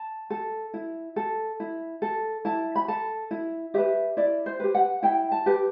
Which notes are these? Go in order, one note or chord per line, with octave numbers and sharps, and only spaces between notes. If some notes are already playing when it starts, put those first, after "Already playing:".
Already playing: A5
A4
E4
A4
E4
A4
E4 A5
B5
A4 A5
E4
G4 B4 E5
E4 D5
C5
G4 B4
F#5
E4 G5
A5
G4 B4